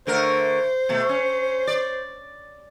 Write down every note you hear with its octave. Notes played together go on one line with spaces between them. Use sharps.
D3 A3 A#4 C5
B2 A3
C#4
D5